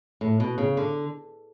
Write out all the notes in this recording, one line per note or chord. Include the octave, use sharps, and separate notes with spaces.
A2
B2
C#3
D3